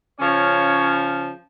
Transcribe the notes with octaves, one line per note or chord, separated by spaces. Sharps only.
C#3 F3 C#4 C#5